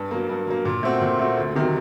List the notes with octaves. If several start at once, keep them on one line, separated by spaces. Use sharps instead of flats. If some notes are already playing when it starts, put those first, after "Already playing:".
Already playing: G2
F#3 A#3
G2
F#3 A#3
A#2
A3 C4 F#4
A#2
A3 C4 F#4
D2
C3 D#3 F#3